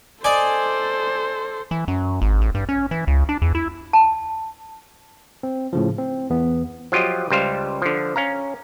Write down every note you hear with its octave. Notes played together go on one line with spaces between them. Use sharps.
A4 C5 D5 D#5 G#5
E3
F#2
G#1
A1
G2
C#4
E3
C#2
D4
E2
E4
A5
C4
A2 C#3 F3
C4
E2 B3
F3 F#3 F4 G4 D#5
C#2 G3 C5 F5
D3 F3
C#4 F5 A#5